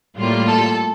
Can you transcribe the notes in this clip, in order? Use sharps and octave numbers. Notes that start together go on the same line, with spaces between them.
A2 G3 A#3 F4
A4